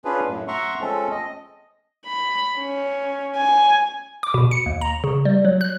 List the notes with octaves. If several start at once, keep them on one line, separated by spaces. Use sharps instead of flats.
C#4 D4 F4 G#4 B4
F#2 A2
E5 F#5 A#5 C6 C#6
F3 G#3 A3 C4 C#4 A4
D#5
B5
C#4
G#5
D6
B2
C#7
D#2
A#5
C#3
G3
F#3
F#6